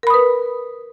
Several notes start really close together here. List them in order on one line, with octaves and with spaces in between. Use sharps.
A#4 B5 D#6 B4